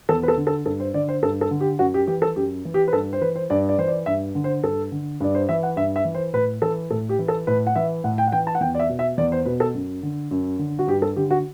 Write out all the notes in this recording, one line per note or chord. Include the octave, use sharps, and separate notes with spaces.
E2 A4
B4
A4
D3
A4
G2 A4
C5
D3 D5
C5
G2 A4
A4
D3
G4
F#2 F#4
G4
E3 G4
A4
F#2 G4
E3
G4
B4
G2 A4
C5
E3 B4
C5
G2 D5
D5
E3 C5
D5
G2 E5
D3
C5
G2 A4
D3
G2 D5
C5
E3 E5
F#5
G2 E5
E5
E3
C5
A2 B4
E3 A4
A2 A4
G4
E3
A4
A2 B4
F#5
E3 E5
A2 F#5
G5
F#5
E3 G5
A5
F#5
E2 G5
D5
E5
B2
E5
E2 D5
C5
B2 B4
A4
F#2
D3
F#2
D3
F#4
G2 G4
A4
D3 G4
F#4